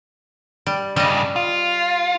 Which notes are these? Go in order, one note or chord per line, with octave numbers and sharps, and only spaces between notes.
G3
G2 C#3 G3 D#5
F4